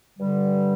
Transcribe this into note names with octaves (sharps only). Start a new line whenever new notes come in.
G2 D3 G3